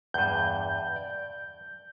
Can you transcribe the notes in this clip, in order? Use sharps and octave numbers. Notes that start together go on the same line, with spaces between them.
E2 G2 G6
D5